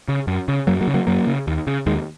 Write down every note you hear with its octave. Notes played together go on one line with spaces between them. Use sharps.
C#3
F#2
C#3
F#2 F#3 A#3
F#3 A#3
C#3
F#3 A#3
F#2 F#3 A#3
C#3
D#2
C#3
D#2 D#3 G#3